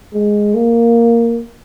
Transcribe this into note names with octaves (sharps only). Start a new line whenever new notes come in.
G#3
A#3